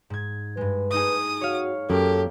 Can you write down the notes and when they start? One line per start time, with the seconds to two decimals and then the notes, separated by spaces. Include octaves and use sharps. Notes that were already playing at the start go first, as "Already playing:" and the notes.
0.10 G#2 G#6
0.57 G2 G#3 B4
0.91 A3 D#4 G#4 D#6
1.41 F#4 C#5 F5
1.90 F#2 A#3 G4 A4